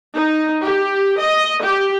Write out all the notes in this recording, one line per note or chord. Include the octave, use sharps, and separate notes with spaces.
D#4
G4
D#5
G4